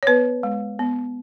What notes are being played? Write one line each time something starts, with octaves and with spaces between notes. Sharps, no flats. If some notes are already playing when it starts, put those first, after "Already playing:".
C#5
B3 B4
G#3
B3